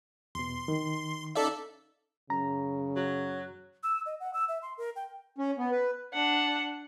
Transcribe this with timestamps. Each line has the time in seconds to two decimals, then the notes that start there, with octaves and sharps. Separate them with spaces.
0.35 E2 B2 C6
0.68 D#3
1.36 C#4 D#4 A4 D5 E5 F5
2.30 F#2 C#3 A#5
2.96 F#3
3.83 E6
4.06 D#5
4.20 F#5
4.33 E6
4.48 E5
4.62 C6
4.78 A#4
4.96 G5
5.38 C#4
5.58 B3
5.72 B4
6.14 D4 F#5